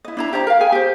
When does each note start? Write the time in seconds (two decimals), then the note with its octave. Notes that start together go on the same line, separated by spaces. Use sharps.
0.05 E4 D#5
0.17 D4 E4 A#5
0.33 G4 C5 D5 A#5
0.47 A#4 F5
0.60 G#4 G5 G#5
0.72 G4 C5